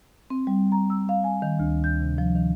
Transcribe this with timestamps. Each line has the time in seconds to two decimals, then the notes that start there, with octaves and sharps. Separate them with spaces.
0.30 C4
0.47 G3
0.72 A#5
0.90 E6
1.09 F5
1.24 G#5
1.42 D#3
1.60 D2
1.84 G6
2.00 C3
2.18 F3
2.35 D#3